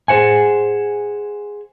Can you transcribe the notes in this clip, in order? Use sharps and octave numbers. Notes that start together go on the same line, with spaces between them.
G#4 B4 C5 F#5 G#5